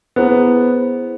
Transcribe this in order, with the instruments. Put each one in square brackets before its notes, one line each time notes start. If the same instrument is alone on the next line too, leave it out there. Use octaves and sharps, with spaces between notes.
[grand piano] B3 [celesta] E4 G#4 C5